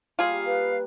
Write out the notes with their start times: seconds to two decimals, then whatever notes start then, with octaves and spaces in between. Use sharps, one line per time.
0.19 G3 A#3 F4 G#4 F5
0.46 B4